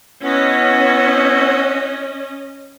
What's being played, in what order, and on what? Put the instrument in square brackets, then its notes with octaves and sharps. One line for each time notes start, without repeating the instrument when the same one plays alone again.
[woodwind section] B3 E4 F#4 [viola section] C#4 D#5